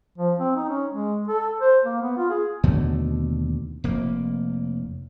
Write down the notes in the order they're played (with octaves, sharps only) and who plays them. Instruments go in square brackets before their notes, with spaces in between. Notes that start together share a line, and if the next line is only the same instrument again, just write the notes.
[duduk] F3
C4
D#4
C#4
G#3
A4
C5
A#3
B3
F4
G#4
[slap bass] D#2 B2 D3 A3
F1 A#3